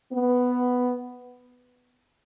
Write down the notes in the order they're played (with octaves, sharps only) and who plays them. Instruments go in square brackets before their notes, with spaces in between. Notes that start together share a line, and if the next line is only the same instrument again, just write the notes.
[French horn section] B3